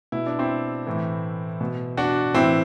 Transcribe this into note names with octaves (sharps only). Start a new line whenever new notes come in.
B2 E4
D4
C4 E4
A2 E3
B2
D4 F#4
A2 E3 C4 E4